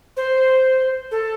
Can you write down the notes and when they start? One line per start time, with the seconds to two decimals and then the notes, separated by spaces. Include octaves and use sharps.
0.17 C5
1.11 A4